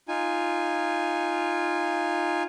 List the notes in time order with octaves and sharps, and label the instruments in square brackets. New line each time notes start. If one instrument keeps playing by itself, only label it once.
[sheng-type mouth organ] D#4 F4 G#5